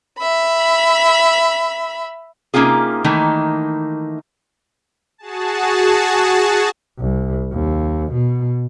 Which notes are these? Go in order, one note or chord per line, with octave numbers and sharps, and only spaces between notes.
E5 B5
C3 A#3 C#4 D#4 F4 G#4
D#3 E3 A3 A#3 D#4
F#4 G#4 A5
C2
D#2
B2